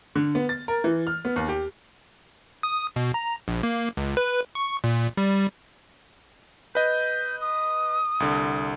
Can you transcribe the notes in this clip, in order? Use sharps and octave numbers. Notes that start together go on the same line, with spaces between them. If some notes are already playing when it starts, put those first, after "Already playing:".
D3
B3
A6
A#4
E3
F6
B3
D#2
G4
D#6
B2
A#5
A#1
A#3
C#2
B4
C#6
A#2
G3
B4 D#5 G6
D#6
C2 D3